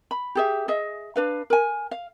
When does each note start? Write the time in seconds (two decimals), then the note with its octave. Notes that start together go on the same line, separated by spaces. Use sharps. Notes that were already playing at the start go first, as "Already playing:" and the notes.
0.11 B5
0.35 G4 G#4 E5
0.68 G#4 D#5 E5
1.16 D4 B4 F5
1.50 A#4 G#5
1.91 F5